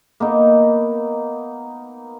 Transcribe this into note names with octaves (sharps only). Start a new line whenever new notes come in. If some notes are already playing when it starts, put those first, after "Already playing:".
A#3 B3 D#4